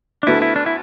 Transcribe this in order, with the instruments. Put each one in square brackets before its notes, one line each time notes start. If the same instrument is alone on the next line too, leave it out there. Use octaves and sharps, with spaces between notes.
[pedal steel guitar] D4
[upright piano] D2 D3 B3 F#4 A4 [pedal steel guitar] E4
[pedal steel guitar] E4
D4
E4